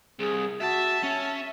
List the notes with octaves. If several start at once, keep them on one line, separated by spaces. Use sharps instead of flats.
C2 G#4
F#4 E5 A5
C#4 E5